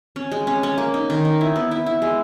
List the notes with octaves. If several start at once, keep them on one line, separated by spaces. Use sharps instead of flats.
C#4
G#3
C#4
C#4
A#3
D#4
D#3
D#4
E4
B3
E4
E4
G#3